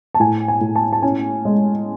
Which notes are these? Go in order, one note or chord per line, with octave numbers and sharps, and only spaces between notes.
A5
A2 G#5
G#5
A2
A5
A5
C#4 G#5
G#3